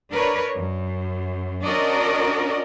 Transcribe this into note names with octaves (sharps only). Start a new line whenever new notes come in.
D4 A#4 B4 C#5
F#2
C#4 D4 F#4 A#4 D5 D#5